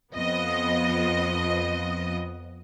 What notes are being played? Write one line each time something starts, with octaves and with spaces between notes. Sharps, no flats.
F2 F3 B3 D#5